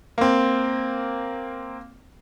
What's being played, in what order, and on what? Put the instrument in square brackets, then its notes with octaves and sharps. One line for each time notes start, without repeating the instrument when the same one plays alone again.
[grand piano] A#3 C4